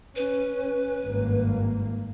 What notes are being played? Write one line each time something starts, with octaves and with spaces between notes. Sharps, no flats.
C#4 B4
G#1 G2 A#3